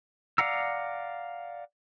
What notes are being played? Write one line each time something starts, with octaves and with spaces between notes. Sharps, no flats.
D5 F5 F#5 A#5 E6